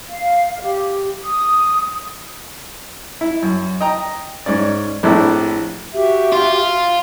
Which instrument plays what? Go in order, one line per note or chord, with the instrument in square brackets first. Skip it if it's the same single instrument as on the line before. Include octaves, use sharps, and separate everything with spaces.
[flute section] F5
G4
D#6
[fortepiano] E4
F#2
D#5 G5 A#5
G#2 C#4 D5
A#1 A2 C4 D4 E4 A4
[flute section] F#4 G4 E5
[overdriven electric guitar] F4